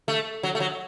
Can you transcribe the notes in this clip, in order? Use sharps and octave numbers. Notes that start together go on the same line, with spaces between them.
A3
F#3
A3
F#3